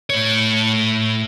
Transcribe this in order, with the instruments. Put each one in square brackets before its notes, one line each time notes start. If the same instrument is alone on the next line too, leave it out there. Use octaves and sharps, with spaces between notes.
[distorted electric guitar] A2 C#5